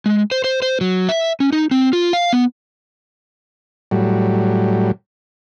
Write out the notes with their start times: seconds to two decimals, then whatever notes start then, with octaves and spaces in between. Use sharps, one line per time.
0.06 G#3
0.31 C5
0.44 C5
0.62 C5
0.81 F#3
1.09 E5
1.40 C#4
1.52 D#4
1.71 C4
1.93 F4
2.13 F5
2.33 B3
3.91 A2 F#3 G3